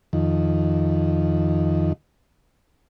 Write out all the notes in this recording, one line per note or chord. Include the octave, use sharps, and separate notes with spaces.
F2 D#3